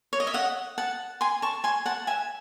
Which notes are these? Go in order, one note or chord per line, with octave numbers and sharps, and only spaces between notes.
C#5
D#5
E5
D#5 F#5
F#5 A5
G#5 C6
A5 C#6
G#5 C6
F#5 A5
E5 G#5